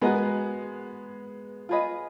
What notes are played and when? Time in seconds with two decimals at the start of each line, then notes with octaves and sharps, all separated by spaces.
0.02 G#3 B3 F#4 A#4 D#5 G#5
1.69 F4 G#4 B4 D#5